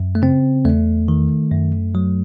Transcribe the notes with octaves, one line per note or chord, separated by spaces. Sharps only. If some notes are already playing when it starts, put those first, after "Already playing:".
Already playing: F#2
A3
C#3 C4
E2 A3
D#3
F#2
F#3